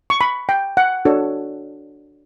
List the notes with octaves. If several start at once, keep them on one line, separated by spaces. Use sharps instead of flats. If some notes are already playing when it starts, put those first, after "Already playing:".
C#6
B5
G5
F#5
D4 F#4 A4 C#5